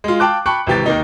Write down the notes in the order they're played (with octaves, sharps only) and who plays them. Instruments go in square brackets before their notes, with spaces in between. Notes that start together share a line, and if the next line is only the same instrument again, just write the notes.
[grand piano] G#3 F4
F5 G5 A5 D6 F#6
G5 A5 B5 C#6 F#6 C#7
G#1 C3 E3 G4 G5 A6
D#2 A#3 D#4